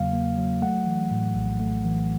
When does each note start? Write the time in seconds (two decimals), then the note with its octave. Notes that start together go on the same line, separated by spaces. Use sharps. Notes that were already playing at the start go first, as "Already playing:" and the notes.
Already playing: E2 C#3 F#3 A#3 F5
0.13 A#3
0.38 F#3
0.62 A3 F#5
0.86 E3
1.11 A2
1.35 A#1
1.60 A3
1.85 E3